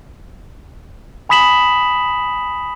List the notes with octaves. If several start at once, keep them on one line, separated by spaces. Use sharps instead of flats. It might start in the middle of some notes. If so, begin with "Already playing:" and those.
G#5 B5 D#6 B6 E7 F#7